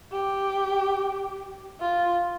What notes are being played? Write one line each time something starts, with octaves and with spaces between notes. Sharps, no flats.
G4
F4